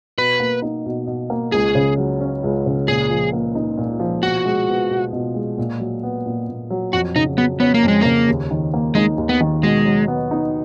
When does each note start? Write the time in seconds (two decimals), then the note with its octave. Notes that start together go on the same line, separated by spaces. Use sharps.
0.18 B2 B4
0.40 A#3
0.62 D#4
0.86 B2
1.07 B2
1.30 A#3
1.52 C#2 G#4
1.75 C#3
1.98 F#3
2.21 C#4
2.43 C#2
2.66 C#3
2.88 A#2 G#4
3.11 F3
3.33 A#3
3.55 D#4
3.78 A#2
4.00 F3
4.23 B2 F#4
4.45 G#3
4.68 B3
4.91 B2
5.13 B2
5.35 G#3
5.58 A#2
5.80 F#3
6.03 B3
6.26 A#2
6.49 A#2
6.70 F#3
6.93 F2 F#4
7.15 C#3 D#4
7.37 F#3 B3
7.60 B3 C#4
7.74 A#3
7.83 F2 G#3
8.01 C#3 A#3
8.28 D#2
8.51 D#3
8.74 A#3
8.95 G#3 D#4
9.18 D#2
9.29 B3
9.41 D#3
9.63 B2 G#3
9.85 F#3
10.08 B3
10.31 D#4